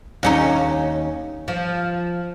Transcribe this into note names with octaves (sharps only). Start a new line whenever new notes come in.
D#2 C#4 D#4
F3